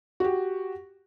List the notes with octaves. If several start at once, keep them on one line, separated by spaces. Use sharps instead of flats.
F#4 G4